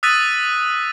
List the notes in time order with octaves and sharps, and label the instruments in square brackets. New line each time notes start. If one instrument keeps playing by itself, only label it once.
[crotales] D#6 E6 F#6 A6 B6 D#7